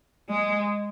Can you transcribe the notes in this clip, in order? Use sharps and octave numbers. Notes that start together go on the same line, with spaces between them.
G#3